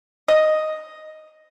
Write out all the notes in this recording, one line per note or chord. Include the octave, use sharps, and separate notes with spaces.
D#5